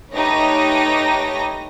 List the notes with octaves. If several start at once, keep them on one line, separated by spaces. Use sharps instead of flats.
A3 D#4 G4 B4 C#5 A#6